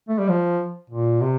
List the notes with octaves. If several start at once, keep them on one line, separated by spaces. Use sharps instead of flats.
A3
G3
F3
A#2
C3